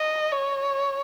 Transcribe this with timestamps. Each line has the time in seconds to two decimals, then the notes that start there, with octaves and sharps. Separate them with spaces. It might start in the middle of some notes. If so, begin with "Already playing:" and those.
Already playing: D#5
0.32 C#5